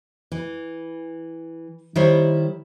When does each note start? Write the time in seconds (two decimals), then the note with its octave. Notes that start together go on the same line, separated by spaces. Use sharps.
0.32 E3
1.96 D#3 G3 E4 C5 C#5